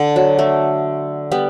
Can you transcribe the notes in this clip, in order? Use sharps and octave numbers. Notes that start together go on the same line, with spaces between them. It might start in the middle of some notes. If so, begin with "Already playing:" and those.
Already playing: D3
F#3
A3
G3 B3